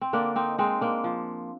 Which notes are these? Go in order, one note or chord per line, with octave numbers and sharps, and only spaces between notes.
C4
D3 A#3 D4
C4 D#4
G#3 C4 D#4
A#3 D4
F3